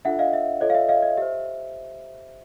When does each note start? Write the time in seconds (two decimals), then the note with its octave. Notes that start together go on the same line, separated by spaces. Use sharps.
0.05 D4 F4 A4 E5 F#5
0.19 D#5 F5
0.33 E5
0.61 F4 A4 C#5 D#5
0.70 F5
0.75 E5
0.89 D#5 F5
1.03 D#5
1.17 G4 C5 E5